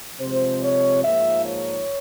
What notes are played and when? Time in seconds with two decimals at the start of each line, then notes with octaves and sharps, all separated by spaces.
0.20 C3 F3 G#3 C5
0.63 C#5
1.03 G#2 F3 A#3 E5
1.45 C#5